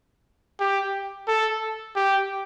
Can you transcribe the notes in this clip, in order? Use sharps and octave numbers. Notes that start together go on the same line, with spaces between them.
G4
A4
G4